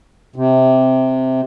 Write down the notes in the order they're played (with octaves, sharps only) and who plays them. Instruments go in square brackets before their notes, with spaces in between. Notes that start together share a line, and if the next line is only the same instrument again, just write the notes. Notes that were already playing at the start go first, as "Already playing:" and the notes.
[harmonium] C3